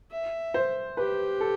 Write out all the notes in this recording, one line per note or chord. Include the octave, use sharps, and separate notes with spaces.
E5
C5
G4 B4
A4